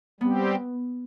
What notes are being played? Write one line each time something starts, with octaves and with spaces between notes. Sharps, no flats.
G3 B3 C4 G4